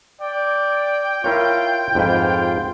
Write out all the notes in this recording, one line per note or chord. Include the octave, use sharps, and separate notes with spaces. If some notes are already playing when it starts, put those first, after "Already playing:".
D5 G5
E4 F4 A#4 C#5
F2 G#2 F4 B4